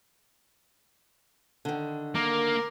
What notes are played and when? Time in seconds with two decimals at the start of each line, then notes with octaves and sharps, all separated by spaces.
1.65 D3 D#3
2.15 A#3 A#4 D6